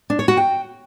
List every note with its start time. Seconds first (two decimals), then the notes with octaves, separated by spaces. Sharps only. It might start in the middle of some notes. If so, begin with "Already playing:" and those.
0.10 D4
0.19 C#5
0.28 F#4
0.37 G5